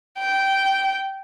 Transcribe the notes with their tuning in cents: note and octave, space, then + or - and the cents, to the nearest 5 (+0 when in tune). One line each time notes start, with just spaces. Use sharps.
G5 -10